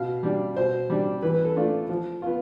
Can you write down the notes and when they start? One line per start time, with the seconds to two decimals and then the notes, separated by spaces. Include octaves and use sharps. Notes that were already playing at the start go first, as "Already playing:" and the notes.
Already playing: B2 F5
0.23 G3 D4
0.56 B2 C5
0.90 G3 D4
1.22 E3 B4
1.34 B4
1.45 A4
1.56 A3 D4 F4
1.89 F3
2.22 B3 F4